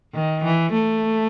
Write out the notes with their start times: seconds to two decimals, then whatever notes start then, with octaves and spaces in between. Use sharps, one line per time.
0.14 D#3
0.44 E3
0.73 A3